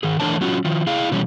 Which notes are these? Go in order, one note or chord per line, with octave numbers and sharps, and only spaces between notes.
D#3 G#4
E3 A3 D4 A#4 C#5 A5
F#3 C#4 F4 F#4
D#3 F3
E4 G#4 F5
B2 E3 G3 C#4